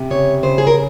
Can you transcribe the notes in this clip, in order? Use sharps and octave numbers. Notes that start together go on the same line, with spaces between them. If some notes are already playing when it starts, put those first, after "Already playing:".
Already playing: C3
C#3 C#5
C#3 C5
G#4
A#4